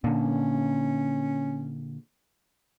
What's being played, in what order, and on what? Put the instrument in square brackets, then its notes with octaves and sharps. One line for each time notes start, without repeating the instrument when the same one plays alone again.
[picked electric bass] A#2 D3 [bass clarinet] C#4